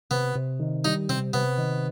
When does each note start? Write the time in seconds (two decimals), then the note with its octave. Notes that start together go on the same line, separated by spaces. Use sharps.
0.11 C3 B3
0.35 C3
0.59 D#3
0.85 G3 D#4
1.09 C3 C4
1.33 C3 B3
1.58 D#3